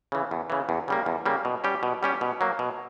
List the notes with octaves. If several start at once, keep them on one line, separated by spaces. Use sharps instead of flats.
C#3 E3
E2
C#3 E3
E2
C#3 G3 A#3
E2
C#3 G3 A#3
B2
G3 C#4 G4
B2
G3 C#4 G4
B2
F#3 A#3
B2